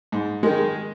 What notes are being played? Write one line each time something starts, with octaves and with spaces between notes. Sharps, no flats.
G#2
D#3 G#3